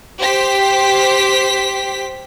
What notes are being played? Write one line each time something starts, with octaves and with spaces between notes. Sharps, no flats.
G4 C5 B6